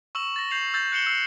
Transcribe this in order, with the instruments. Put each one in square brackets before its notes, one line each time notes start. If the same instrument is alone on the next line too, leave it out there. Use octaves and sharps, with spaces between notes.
[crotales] C#6 E6 E7 F#7
A6 A#6
G6 C7 F7 F#7
E6 G6 A6
F#6 C7 C#7 E7 F#7 G7
E6 C7